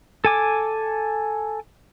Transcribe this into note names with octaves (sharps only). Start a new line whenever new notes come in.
A4 G#5 D6